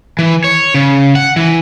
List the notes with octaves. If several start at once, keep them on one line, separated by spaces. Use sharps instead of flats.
E3
C#5
C#3
F#5
E3